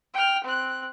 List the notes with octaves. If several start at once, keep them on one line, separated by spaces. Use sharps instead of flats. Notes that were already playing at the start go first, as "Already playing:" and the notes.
G5 F6
C4 F#6